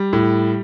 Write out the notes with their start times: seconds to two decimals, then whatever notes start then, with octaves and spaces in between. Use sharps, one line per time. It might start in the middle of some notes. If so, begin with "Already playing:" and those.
Already playing: G3
0.13 A2